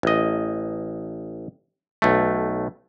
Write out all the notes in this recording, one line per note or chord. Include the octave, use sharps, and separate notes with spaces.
A1 D#5
B1 A3